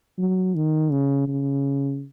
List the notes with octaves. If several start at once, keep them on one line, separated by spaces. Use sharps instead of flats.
F#3
D#3
C#3
C#3